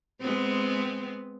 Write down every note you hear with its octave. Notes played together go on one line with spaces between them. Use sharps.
G#3 B3 C4